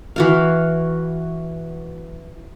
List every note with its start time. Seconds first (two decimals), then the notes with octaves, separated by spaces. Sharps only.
0.16 E3 F#4 F5